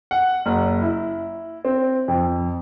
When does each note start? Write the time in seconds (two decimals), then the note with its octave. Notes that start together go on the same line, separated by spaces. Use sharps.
0.11 F#5
0.46 F#1
0.82 E4
1.65 C4
2.08 F2